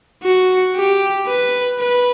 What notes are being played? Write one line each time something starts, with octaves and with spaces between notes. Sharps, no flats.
F#4
G4
B4
B4